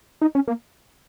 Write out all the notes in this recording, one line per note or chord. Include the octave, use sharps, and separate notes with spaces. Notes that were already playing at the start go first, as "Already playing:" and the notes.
D#4
C#4
A#3